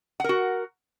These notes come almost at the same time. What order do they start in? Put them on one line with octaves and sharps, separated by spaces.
F#5 A#4 F#4